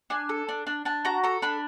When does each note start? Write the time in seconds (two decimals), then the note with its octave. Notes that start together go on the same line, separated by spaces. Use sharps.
0.10 D4 G#5
0.29 A4
0.49 D4
0.67 D4
0.85 D4 A5
1.05 F#4 A#5
1.24 A4 A#5
1.42 D4 B5